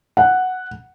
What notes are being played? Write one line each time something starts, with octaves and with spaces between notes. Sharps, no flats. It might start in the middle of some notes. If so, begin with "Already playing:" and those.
F#5